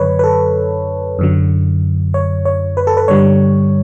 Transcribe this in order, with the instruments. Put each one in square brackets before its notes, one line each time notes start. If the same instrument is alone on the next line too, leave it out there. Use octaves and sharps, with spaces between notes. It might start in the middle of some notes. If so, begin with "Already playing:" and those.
Already playing: [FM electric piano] F#2 D3 F#3 B4 C#5
B4
A4
F#2 D3 F#3
C#5
C#5
B4
A4
B4
G2 D3 G3 C#5